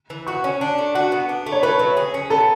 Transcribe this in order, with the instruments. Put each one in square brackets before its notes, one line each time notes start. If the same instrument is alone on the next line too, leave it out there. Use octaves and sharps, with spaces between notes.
[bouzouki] E3
[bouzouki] F#4 [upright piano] C#6
[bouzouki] C#4
D4
A3
[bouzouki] F#4 [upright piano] F#5
[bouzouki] B3
D4
A3
[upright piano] C#5
[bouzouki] A3 [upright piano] B4
[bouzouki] F#3
G#4
C#4
[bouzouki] B3 [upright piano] A4